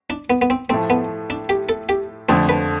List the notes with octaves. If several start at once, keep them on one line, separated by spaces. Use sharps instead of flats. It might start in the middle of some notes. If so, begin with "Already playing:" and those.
D4
B3
B3
C4
A2 F3 A3 C4
B3
D4
G4
A4
G4
F2 D3 F3 A3 C4
B4